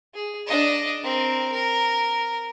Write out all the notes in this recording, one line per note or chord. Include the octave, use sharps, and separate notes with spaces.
G#4
D4 D#5
C4 A#4
A#4